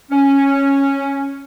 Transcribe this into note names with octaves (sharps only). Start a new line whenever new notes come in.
C#4